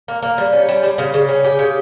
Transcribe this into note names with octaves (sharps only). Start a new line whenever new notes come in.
A#3
A#3
G3
C#4
G3
G3
C#3
C#3
C#4
G4
C#3